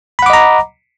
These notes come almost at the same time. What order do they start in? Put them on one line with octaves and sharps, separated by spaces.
B5 F#5 D6 D#5 A#5